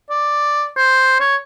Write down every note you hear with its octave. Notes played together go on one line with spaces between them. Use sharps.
D5
C5
C#5